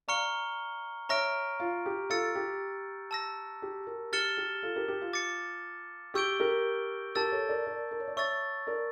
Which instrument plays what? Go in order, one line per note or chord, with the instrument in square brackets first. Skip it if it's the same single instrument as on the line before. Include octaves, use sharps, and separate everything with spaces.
[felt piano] D5 F5 [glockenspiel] A#5 C#6 F6 C#7 G7
[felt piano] C#5 E5 [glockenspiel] A#5 C#6 F6 A#6 D7
[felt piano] F4
G4
[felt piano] F4 A4 [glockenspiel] E6 A6 C#7
[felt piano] G4
[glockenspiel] A5 E6 A#6
[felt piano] G4
G4 A#4
[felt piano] G4 [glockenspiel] F6 A6 C#7 E7 G7
[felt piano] G4
F4 A4
G4 A#4
G4
F4
[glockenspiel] D6 A6 C#7
[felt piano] G4 [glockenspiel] C#6 E6 G6 D7 G7
[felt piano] G4 A#4
[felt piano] G4 A#4 [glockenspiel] A5 E6 A6
[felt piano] A4 C#5
A#4 D5
A#4 D5
A#4
C#5
D5
[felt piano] C#5 E5 [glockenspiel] C#6 E6 A6
[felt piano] A#4 D5